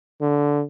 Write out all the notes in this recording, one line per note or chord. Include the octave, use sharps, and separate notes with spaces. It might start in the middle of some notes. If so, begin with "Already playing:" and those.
D3